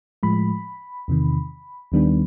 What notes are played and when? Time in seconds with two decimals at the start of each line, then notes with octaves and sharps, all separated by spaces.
0.23 A2 F3 G#3 B5
1.08 E2 C3 D#3
1.92 D#2 D#3 G3 B3 D4